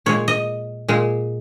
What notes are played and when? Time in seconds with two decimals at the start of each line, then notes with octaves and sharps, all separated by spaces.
0.06 A#2 G#3 C#5
0.28 D#5
0.88 A#2 G#3